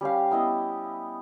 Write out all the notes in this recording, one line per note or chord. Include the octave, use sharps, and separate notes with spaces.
G3 C#4 G4 F5
B3 E4 D#5